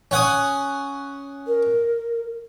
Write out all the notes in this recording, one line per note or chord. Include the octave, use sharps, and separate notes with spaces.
C#4 F#5 D#6
A#4